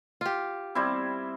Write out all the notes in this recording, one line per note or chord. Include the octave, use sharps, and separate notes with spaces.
F4 G4
G3 C4 E4